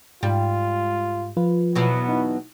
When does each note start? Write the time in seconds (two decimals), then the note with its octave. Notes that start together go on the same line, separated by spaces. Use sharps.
0.23 G#2 G3 F4
1.37 F3 F4 B4
1.75 E2 B2 F#3 B3
2.09 D#4 E4